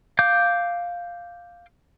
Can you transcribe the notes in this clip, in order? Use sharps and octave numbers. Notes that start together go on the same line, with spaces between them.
F5 D6 G6